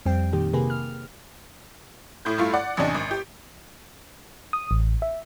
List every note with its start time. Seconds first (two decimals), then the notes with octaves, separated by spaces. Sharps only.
0.06 F2 G3 C4 G5
0.33 A#2 D#3 G4
0.53 C3 A#3 G4 G#4 B4
0.70 F6
2.25 A2 E4 G6
2.38 G2 A3 E4 F4
2.54 D5 F#5
2.77 A1 E2 C3 D4 D#5
2.94 G#1
3.11 G4
4.53 D#6
4.71 A1
5.02 E5